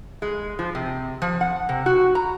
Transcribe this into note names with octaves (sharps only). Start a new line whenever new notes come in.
G#3
F3
C3
F3
F#5
C3
F#4
A#5